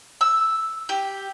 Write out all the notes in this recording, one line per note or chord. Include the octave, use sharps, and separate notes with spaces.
E6
G4